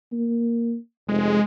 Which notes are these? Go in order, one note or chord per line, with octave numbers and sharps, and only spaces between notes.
A#3
F1 G#3